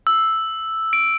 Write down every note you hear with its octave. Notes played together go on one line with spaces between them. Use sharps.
E6
D7